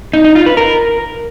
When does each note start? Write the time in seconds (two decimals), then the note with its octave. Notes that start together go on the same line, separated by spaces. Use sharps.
0.13 D#4
0.24 D#4
0.35 F4
0.46 B4
0.57 A#4